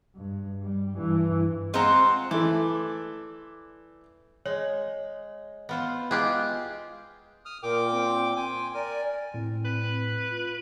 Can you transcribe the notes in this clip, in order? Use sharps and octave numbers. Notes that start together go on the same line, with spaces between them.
G2
G3
G2 E3
G#3 C4 F4 C5 F#5 A#5
E3 A3 D5
G#3 C#5
B3 F4 C5
G#3 F4 G4 G#4 F#6
D#6 F6
A#2 A#4 G5 D6
C4
G5 G#5 C6
A#4 D5 G#5
A2 C4
B4
F4